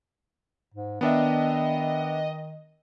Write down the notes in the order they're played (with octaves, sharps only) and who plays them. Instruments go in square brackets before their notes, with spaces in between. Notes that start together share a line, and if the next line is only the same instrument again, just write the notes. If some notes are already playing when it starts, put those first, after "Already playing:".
[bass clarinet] G#2
[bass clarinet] D#3 [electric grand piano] B3 D4 E5 [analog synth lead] D#5